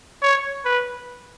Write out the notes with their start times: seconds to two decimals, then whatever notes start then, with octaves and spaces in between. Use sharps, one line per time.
0.22 C#5
0.65 B4